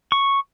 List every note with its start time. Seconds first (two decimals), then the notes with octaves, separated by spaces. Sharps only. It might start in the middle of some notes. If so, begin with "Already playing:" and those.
0.12 C#6